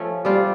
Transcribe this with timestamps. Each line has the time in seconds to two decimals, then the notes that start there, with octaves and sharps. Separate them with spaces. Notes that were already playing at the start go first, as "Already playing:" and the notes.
Already playing: F3 A3 C#4
0.25 G3 C4 F4